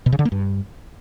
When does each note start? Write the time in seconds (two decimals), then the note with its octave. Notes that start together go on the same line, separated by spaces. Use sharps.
0.06 B2
0.12 C#3
0.19 D3
0.25 A#3
0.32 G2